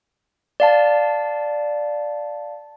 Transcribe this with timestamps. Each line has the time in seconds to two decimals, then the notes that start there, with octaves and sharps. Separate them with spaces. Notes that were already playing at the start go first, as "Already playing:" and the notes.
0.60 D5 F5 A5